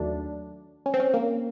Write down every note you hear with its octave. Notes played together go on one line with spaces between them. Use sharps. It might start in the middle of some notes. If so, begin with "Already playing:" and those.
Already playing: D#2 D#3 F#3 A3 D4
C#4
C4
C#4
A#3